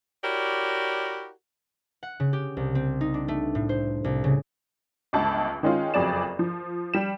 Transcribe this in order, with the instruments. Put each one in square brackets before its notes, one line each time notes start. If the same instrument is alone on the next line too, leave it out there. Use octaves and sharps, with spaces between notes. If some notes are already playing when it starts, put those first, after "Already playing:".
[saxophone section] E4 F#4 G4 A#4 C#5 D5
[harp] F#5
C#3
G4
C2
C4
D#4
D4
A3
A2
C5
C2
C#3
[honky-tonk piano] G1 C#2 A5
D#3 G#3 C#4 F4
F#1 F2 F#3 G#4 D5 E7
F3
G3 E7